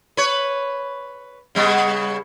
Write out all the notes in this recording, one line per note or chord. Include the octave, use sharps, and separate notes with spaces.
B4 C#5
C#3 G3 B3